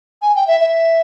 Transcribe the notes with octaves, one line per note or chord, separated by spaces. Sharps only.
G#5
G5
E5
E5